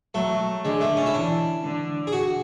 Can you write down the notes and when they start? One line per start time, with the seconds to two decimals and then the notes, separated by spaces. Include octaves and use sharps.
0.14 F#3 A3
0.65 D3 G#3
0.81 A3
0.97 C#4
1.06 E4
1.14 E3 D4
1.63 D3
2.07 G#4
2.12 F#4